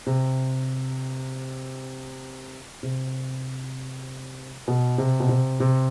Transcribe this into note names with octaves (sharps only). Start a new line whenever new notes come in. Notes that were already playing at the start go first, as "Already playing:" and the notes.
C3
C3
B2
C3
B2
C3
C3